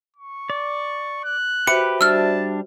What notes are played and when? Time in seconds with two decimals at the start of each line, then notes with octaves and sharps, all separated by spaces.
0.16 C#6
0.50 D5
1.24 F#6
1.67 F#4 G4 B4 C5 E5 C#7
2.01 G3 D4 A5 E6 F6